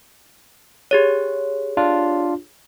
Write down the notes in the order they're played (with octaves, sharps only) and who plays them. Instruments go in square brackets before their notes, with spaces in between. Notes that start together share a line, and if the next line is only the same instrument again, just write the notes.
[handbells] G4 G#4 C#5
[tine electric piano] D4 F4